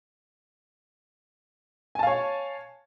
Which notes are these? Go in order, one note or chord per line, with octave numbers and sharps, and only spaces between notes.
C#5 F5 G#5 A5